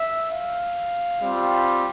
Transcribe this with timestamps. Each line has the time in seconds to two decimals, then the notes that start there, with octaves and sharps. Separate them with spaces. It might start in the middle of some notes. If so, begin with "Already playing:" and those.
Already playing: E5
0.30 F5
1.21 G3 C4 F4